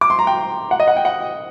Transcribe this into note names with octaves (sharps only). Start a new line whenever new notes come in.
D6
C6
A#5
G5
F#5
D#5
F#5
G5
F#5